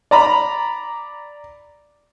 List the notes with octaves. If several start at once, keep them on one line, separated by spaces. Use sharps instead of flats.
D5 A#5 B5